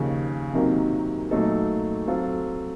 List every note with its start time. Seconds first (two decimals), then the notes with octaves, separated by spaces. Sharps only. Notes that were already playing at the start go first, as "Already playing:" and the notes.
Already playing: D#2 C#3 F3
0.53 C3 D#3 F#3 A#3
1.31 A#2 F#3 A3 D#4 A4
2.07 F#3 C4 F4 A4